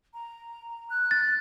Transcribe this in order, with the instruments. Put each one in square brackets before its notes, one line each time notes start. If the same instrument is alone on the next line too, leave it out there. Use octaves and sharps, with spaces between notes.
[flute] A#5
F#6
[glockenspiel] A6